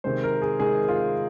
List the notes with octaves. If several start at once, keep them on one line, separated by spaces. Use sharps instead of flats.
C3 D#3 G#3 C5
A#4
G#4
C3 D#3 G#3 G#4
F4